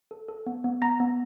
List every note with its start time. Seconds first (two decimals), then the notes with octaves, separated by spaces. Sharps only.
0.11 A4
0.28 A4
0.46 B3
0.64 B3
0.82 B3 A#5 A#6
1.00 B3